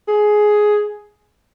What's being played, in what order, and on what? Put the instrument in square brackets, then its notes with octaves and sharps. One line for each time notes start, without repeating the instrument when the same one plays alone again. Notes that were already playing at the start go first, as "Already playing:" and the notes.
[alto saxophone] G#4